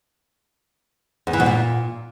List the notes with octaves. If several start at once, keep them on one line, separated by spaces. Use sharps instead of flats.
E2
E3
B2
A#2